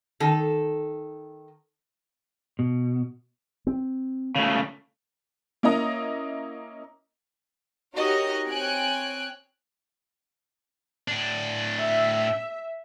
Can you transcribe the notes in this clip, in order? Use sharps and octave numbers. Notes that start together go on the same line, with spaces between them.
D#3 A4
B2
C4
C#3 A3
A#3 C#4 E4 D#5 A#5
D#4 F#4 G4 A#4 C#5 D#5
C4 C#5 G5 G#5 F#6 D7
A2 D4
E5